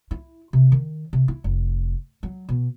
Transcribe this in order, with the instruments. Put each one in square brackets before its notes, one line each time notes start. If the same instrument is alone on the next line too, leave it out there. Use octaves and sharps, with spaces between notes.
[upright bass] E4
C3
D#3
C3
E4
F1
F#3
B2